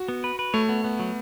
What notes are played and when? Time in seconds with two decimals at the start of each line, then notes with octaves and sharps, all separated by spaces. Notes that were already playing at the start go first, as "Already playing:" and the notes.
Already playing: F#4
0.09 B3
0.24 B4
0.39 B4
0.54 A3 C#5
0.69 B3
0.84 B3
0.99 F#3